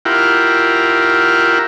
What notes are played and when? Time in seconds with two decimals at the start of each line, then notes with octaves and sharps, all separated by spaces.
0.05 E4 F4 G4 A#4 F#5